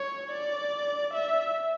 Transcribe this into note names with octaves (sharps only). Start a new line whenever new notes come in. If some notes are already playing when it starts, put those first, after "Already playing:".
Already playing: C#5
D5
E5